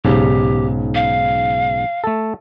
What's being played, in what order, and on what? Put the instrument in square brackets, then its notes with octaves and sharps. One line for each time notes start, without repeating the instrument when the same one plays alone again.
[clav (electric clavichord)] B1 G#2 C#3 [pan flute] G4
[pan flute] F5
[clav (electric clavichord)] A3 A4